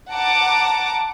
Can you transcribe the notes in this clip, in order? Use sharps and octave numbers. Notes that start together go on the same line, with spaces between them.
F#5 A5 A#5 D6